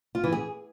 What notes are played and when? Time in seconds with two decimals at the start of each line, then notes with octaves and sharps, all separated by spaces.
0.15 F4
0.24 E3
0.32 G#4